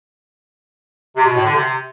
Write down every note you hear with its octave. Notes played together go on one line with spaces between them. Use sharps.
C3
B2
A2
D3
C3